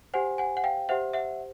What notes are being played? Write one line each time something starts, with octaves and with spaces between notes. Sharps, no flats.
G4 C5 F#5 G#5
F#5 G#5
F#5
F5 G5
G4 C5 E5 F#5
E5 F#5